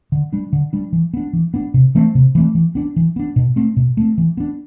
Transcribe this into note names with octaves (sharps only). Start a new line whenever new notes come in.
D3
G3 D4
D3
G3 D4
E3
B3 D4
E3
B3 D4
C3
E3 A3 C4
C3
E3 A3 C4
E3
B3 D4
E3
B3 D4
B2
A3 C4
B2
A3 C4
E3
B3 D4